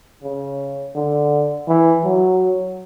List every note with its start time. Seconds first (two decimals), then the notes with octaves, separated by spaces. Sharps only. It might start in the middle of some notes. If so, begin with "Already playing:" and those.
0.23 C#3
0.95 D3
1.68 E3
2.04 F#3